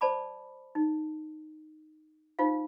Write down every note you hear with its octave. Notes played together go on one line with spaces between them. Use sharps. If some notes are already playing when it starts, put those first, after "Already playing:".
C5 D5 A5 B5 D6
D#4
D#4 F4 C5 F5